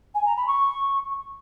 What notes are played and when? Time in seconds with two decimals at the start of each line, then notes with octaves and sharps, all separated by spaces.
0.14 G#5
0.25 A#5
0.36 B5
0.47 C#6